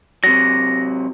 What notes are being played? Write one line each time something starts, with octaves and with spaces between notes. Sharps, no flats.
C3 F#3 A#6